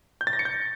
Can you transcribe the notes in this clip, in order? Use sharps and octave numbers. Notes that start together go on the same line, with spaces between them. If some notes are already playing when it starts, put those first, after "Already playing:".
G6
A6
A#6
C#7
G6